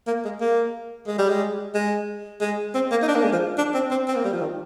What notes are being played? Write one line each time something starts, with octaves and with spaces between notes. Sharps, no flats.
A#3
G#3
A#3
G#3
G3
G#3
G#3
G#3
C4
A#3
D#4
D4
A#3
G#3
F3
D4
C4
C4
C4
A#3
G3
F3
D#3